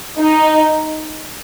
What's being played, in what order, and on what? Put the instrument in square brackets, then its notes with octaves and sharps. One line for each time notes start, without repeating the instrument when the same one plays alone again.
[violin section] D#4